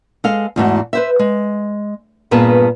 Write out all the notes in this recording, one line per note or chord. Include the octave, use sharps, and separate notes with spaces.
G#3 A4 F5
E2 G#2 A3 F#4
B4 C5 E5
G#3
G2 A#2 B3 G#4 B4 A5